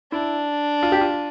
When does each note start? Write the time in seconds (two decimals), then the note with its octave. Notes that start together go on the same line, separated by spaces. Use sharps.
0.12 D4 E4
0.83 F4
0.92 G4
1.01 F4